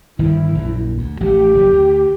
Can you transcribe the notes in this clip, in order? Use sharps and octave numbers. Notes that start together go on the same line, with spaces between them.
G1 D#3 F3 E4
A#1 F#2
D2
A1 F3 A3 G4
F#1
D2